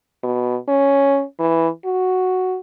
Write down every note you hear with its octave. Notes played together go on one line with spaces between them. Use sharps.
B2
C#4
E3
F#4